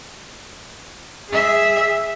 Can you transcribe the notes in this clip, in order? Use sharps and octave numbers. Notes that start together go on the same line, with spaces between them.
G#4 E5